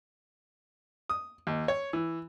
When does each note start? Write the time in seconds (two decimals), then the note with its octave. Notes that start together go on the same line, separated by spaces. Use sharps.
1.09 D#6
1.47 D#2
1.68 C#5
1.93 E3